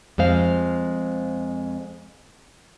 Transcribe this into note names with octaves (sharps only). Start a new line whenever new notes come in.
F2 G#3 C5 F5